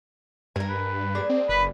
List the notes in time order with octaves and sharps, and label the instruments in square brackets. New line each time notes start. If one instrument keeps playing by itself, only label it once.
[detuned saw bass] G2 [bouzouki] A#4 G#5
[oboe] B4
[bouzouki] A#3 D4 G#4
[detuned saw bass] C4
[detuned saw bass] F#1 [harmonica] B4 [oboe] B5